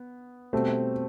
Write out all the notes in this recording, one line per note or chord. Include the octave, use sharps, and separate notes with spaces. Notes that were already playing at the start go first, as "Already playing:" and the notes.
Already playing: B3
B2 G3 A3 C4